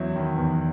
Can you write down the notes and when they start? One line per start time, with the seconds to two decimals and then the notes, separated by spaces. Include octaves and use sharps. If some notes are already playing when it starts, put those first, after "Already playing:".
Already playing: E2 F#3 E4
0.16 D#3
0.38 E2